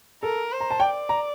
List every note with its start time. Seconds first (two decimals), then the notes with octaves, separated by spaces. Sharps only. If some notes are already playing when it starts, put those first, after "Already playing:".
0.23 A4 A#4
0.52 C5
0.61 A#5
0.71 A5
0.80 D5 G5
1.09 A#5